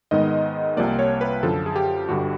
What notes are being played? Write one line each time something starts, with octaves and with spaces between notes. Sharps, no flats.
G#2 D#3 G#3 B3 D#5
C2 C3 F3 A#3 D5
C#5
B4
F#2 D3 F3 A4
G#4
G4
G1 G2 D3 G3 F#4